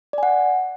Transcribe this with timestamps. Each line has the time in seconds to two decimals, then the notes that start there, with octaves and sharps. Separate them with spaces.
0.13 D5
0.18 G#5
0.23 F#5